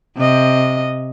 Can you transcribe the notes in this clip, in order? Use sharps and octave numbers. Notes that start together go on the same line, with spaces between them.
C3 D#5